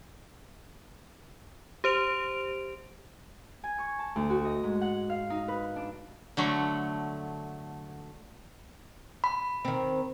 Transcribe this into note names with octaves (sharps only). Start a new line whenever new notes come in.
G4 C5 D7 F7
G#5
C#6
A5
D2
F#4
D#5
G#2
F#5
F5
D#4
B4
D4
D3 F#3 A3
B5
D#3 C4